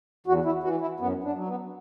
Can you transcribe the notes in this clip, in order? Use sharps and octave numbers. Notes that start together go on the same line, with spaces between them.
E2 F#4
E4
E3 F#4
E4
F#2 B3
D4
F#3
B3